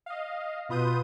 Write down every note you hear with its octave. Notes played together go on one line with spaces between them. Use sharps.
D#5 F5
B2 F4 B4 D#6 G6 D#7